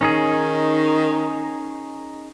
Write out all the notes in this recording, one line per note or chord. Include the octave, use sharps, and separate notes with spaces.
D#3 C#4 D#4 G#4